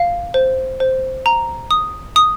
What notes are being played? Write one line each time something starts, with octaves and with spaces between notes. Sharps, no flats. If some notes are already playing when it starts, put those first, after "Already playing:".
Already playing: F5
C5
C5
A#5
D#6
D#6